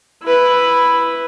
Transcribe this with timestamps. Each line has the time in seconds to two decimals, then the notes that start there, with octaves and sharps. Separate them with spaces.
0.23 E4 B4